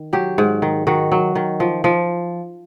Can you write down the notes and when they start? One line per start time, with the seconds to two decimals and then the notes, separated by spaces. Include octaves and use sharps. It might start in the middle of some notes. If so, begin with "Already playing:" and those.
Already playing: D#3
0.13 F#3 G4
0.38 G#2
0.62 D#3
0.87 D#3 F#4
1.12 F#3
1.35 D#3
1.60 F3
1.84 F3